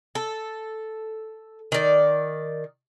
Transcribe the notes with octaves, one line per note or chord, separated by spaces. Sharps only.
A4
D#3 D5